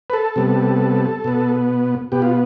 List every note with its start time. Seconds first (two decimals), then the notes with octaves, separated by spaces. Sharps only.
0.10 B4
0.13 A4
0.36 C3 G3 B3
1.24 B2 B3
2.12 B2 B3 G4
2.22 F4